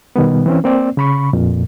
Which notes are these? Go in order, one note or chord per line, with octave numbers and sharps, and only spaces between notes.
B2 D#3 G3 B3
E3 C4 C#4
A#3 C4 D5
C#3 B5 C#6
F2 A#2